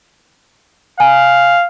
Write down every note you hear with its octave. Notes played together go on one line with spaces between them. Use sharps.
F5 G#5